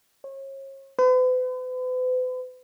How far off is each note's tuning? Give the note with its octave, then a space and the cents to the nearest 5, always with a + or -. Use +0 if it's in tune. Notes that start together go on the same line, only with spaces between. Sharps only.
C#5 -35
B4 +45